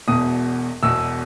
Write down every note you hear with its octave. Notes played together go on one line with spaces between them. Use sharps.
E1 E2 B2 D#6
E1 E2 B2 E6